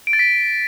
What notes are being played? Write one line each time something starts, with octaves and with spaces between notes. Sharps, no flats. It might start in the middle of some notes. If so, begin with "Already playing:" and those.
D7
A6
B6